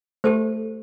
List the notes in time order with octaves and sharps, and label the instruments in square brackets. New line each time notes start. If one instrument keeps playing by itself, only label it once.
[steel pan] A3 [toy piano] G4 A4 C5